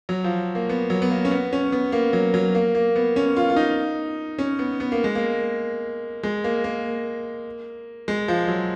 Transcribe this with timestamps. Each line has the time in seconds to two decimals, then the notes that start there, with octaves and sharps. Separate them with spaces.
0.09 F#3
0.24 F3
0.55 A#3
0.69 B3
0.90 F#3
1.02 B3
1.11 A#3
1.25 C#4
1.31 B3
1.53 C#4
1.72 B3
1.92 A#3
2.13 F#3
2.34 F#3
2.55 A#3
2.75 A#3
2.96 B3
3.16 C#4
3.37 F4
3.50 F4
3.56 D#4
4.39 C#4
4.59 B3
4.80 B3
4.92 A#3
5.04 G#3
5.15 A#3
6.23 G#3
6.44 A#3
6.64 A#3
8.08 G#3
8.28 F3
8.48 F#3